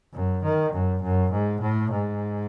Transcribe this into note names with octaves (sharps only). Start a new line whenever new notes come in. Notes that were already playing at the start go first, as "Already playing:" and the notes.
F#2
D#3
F#2
F#2
G#2
A2
G#2